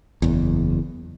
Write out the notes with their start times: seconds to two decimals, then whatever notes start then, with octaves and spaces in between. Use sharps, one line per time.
0.22 F#1 E2